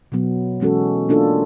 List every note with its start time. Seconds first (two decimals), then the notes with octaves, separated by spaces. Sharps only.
0.12 B2 F#3 B3
0.60 E3 G#3 C#4 F#4 A4
1.09 A#3 D4 F4 A4